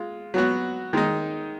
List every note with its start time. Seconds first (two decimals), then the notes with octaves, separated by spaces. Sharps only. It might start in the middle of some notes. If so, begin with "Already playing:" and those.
Already playing: G#3 F4
0.34 F#3 B3 F#4
0.93 D#3 G#3 D#4